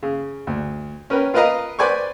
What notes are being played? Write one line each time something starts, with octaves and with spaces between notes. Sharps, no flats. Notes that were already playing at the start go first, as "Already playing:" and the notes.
C#3
D2
C#4 A#4 B4 G5
F4 A#4 B4 D#5 F5 A#5
B4 C5 D5 G#5 B5 C#6